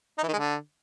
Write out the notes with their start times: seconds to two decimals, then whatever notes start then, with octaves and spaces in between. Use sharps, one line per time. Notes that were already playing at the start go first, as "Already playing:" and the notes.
0.18 D#4
0.23 E3
0.28 D#3
0.33 G#3
0.38 D3